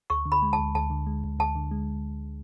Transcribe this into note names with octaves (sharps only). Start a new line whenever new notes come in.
D2 C#6
D3
B5
G#3
A5
D2
D2 A5
D3
G#3
D2
D2 A5
D3
G#3